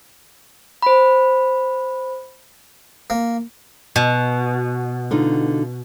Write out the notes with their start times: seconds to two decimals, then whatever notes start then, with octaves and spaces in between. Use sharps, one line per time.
0.82 C5 B5
3.10 A#3
3.96 B2
5.11 D3 D#4 F4